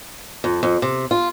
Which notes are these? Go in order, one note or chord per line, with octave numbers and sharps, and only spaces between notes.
F2
F2
C3
F4